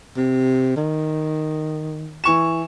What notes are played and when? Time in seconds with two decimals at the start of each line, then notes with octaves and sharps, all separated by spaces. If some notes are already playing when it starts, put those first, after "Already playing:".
0.17 C3
0.76 D#3
2.24 E3 C#6 E7